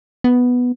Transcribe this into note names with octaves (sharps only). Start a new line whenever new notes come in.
B3